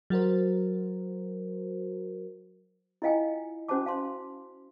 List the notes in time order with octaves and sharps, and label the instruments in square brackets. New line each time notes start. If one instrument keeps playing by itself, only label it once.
[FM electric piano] F#3 F#4 A#4 C5
[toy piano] E4 F4 D#5 F5 G5 G#5
C#4 F#4 C5 G#5 A5 D6
F5 A5 C6